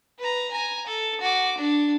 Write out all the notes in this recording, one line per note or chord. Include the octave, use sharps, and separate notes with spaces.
B4 A#5
G#5 A#5
A4
F#4 D6
D4